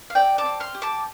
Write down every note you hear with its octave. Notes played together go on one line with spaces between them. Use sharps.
F5
C4 D5 G5
A5 D6
C4
C6 F6
G4
A5 D6